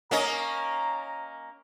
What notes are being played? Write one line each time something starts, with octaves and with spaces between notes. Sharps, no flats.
A#3 C#4 D#5 A#5